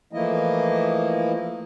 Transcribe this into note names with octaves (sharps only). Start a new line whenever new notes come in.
E3 F3 A3 A#3 E4 D#5